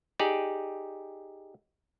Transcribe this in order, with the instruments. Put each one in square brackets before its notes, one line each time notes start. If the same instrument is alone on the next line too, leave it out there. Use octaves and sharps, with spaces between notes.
[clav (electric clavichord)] D#4 G4 G#4 D5